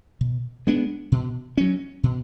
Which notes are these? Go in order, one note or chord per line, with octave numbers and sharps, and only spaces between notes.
B2
G#3 B3 D4
B2
F#3 C#4
B2